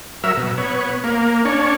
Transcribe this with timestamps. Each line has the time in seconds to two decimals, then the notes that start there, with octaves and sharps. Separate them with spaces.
0.24 F#3 A#4 E5 E6
0.37 B2
0.58 B3 C#5
1.04 A#3
1.45 C#4 D4 C#5